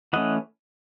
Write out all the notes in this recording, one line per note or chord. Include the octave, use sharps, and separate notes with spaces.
E3 A3 C#4 D#5 F#5